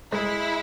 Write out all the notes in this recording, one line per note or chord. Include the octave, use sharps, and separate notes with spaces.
G#3 E4